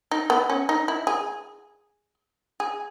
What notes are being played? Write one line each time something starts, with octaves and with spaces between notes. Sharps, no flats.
D#4
B3
C#4
D#4
E4
G#4
G#4